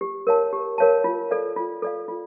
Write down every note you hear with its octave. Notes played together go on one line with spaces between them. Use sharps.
G4
A#4 C#5 F5 A5
G4
A#4 C#5 F5 A5
F4
A4 D5 F5
F4
A4 D5 F5
F4